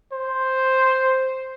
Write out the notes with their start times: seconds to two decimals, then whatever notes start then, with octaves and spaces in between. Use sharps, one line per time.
0.13 C5